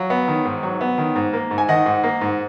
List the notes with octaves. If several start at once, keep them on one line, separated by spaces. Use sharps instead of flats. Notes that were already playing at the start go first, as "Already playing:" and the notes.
Already playing: F#3 F5
B3
D#3
G#2
F#3
B3
D#3
G#2
A#3
G#2
G#5
D#3 D#5 F#5
G#2
A#3
G#2